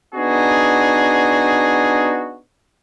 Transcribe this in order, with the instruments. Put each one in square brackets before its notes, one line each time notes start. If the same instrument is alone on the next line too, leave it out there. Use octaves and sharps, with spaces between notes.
[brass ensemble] B3 D4 D#4 F#4 G#4